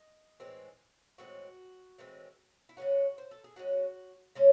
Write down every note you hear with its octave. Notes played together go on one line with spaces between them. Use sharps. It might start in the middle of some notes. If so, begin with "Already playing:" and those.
Already playing: D#5
A2 E3 G#3 C4
A2 E3 G#3 C4 F#4
A2 E3 G#3 C4
E4
C#3 G#3 C#4 F#4
C5
A4
G#4
C#3 G#3 C#4 F#4
C#3 G#3 C#4 C#5